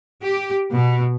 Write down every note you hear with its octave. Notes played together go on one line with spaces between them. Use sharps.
G4
B2